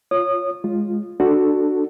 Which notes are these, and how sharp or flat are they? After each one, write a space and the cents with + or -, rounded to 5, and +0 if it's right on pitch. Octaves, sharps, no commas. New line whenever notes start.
F4 +5 C#5 +0 D#6 -25
G#3 +0 F4 +0
D4 +15 F#4 +0 A4 +0